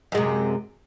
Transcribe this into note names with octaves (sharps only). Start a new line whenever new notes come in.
F#2 C3 G#3